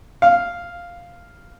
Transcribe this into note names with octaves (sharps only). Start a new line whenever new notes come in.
F5